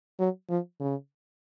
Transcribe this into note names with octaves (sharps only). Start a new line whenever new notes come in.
F#3
F3
C#3